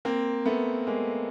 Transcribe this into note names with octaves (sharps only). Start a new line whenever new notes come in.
A#3 C4
A3 B3
G#3 A#3